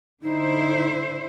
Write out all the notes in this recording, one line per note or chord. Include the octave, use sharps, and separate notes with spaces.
D3 D#4 E4 C5